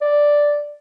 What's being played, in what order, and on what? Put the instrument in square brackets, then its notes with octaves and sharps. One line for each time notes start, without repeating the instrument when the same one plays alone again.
[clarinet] D5